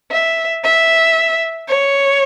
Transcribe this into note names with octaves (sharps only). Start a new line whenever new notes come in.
E5
E5
C#5